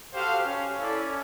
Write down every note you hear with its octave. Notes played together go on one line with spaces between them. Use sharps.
F#4 G4 A4 C5 F5
C#4
E4 A4 D5